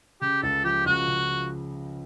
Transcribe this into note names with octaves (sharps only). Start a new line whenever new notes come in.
C#3 G4
C#2 A4
F3 G4
C#2 F#4
C#3